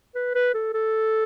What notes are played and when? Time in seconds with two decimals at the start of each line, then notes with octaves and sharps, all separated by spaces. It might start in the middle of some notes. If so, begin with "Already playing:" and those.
0.15 B4
0.35 B4
0.54 A4
0.74 A4